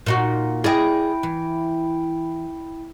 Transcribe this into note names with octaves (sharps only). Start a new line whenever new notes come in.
A#2 D#4 F#4
E4 G#4 D5 D#5 G5
E3